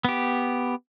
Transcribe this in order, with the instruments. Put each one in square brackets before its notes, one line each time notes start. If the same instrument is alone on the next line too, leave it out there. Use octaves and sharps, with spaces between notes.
[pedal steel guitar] B3 G4